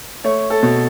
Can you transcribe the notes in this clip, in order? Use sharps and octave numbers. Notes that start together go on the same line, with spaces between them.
A3 C#5
A4
B2